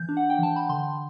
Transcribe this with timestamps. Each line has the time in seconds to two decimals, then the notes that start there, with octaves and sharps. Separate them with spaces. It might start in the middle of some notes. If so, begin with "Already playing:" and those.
Already playing: E3 G6
0.09 D4
0.17 F#5
0.30 G5
0.38 E3 A5
0.56 B5
0.69 D3 C6